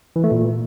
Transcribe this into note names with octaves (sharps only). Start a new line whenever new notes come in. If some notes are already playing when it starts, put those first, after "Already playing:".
E3
A3
A#2